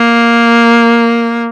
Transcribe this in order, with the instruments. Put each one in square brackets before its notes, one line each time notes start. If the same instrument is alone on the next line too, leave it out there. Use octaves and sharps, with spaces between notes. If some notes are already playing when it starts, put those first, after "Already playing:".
Already playing: [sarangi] A#3